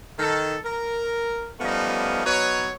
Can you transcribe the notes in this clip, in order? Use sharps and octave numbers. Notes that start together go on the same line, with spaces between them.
D#3 A4
A#4
F3 G3 A3 B3 C#4 D#4
F#3 B3 D#4 B4 C#5